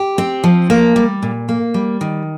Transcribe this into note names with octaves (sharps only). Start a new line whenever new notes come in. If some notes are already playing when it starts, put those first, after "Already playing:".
Already playing: G4
C4
F3
A#3
G3
A#2
A#3
G3
D#3